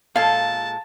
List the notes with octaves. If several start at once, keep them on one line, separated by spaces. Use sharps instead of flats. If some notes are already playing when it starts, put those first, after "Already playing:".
A#2 G#3 A4 F5 A5